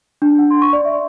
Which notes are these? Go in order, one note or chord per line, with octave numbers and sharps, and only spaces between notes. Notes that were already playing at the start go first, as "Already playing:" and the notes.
D4
F#5
C6
C#6
D5
E5